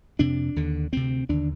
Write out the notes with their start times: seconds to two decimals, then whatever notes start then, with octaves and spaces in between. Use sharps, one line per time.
0.19 F2 C3 D4
0.56 D#2 D3
0.92 D2 C3 C4
1.29 D#2 D3 D4